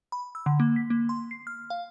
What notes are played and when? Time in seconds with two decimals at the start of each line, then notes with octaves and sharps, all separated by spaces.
0.12 B5
0.35 E6
0.46 D3
0.60 A#3
0.76 B6
0.90 A#3
1.09 C6
1.31 C7
1.47 F6
1.70 F5